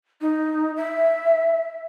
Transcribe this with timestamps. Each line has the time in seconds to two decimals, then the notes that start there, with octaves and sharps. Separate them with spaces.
0.21 D#4
0.76 E5